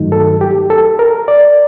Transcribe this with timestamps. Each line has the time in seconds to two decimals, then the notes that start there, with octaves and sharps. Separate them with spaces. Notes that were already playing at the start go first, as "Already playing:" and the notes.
Already playing: G2 D#3 F#3 A3 D#4
0.12 A4
0.41 G4
0.70 A4
0.99 A#4
1.28 D5